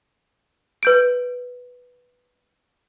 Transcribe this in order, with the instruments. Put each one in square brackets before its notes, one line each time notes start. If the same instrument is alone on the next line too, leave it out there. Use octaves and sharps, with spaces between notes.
[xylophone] B4 G6 D7